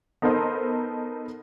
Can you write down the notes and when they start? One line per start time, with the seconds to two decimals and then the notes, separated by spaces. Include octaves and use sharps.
0.22 B3 D#4 A4 A#4 C5 D#5